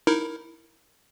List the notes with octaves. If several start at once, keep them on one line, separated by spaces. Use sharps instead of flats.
D#4 E4 A#4